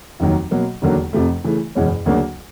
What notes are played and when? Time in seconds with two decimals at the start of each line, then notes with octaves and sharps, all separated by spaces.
0.20 F1 D#2 D#3 F#3
0.51 B2 F#3 A#3
0.82 E1 D#2 D3 F#3 A#3
1.13 F1 F2 C3 F3 A3
1.44 C#3 E3 A3
1.75 F#1 E2 B2 G#3 C#4
2.06 D2 C#3 F#3 A#3 D4